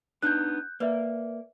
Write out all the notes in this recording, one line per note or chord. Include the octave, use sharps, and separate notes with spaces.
B3 D4 D#4 F#6 G6
A#3 B4 D5 E5